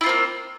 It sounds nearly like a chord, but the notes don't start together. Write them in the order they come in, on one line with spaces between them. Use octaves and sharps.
E4 F4 C4 A#3